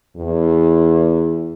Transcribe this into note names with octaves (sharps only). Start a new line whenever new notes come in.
E2